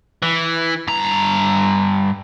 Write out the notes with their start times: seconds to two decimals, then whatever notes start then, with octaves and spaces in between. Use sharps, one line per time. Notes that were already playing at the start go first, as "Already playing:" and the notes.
0.22 E3
0.88 G2 A#5